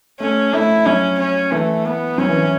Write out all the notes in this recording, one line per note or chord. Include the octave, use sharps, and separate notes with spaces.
A3 C#4
A3 E4
F#3 C#4
C#4
E3 A3
B3
F#3 C#4
E3
E3